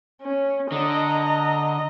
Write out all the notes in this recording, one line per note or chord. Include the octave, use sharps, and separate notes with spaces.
C#4
D3 D#5 A#5